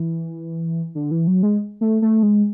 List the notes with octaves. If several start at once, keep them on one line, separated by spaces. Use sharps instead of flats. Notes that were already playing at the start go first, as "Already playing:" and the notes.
Already playing: E3
D3
E3
F#3
G#3
A3
A3
G#3